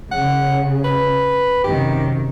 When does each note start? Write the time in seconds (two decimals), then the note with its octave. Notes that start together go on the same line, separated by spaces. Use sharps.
0.12 C#3 F#5
0.84 B4
1.64 F#2 C3 D#3 G4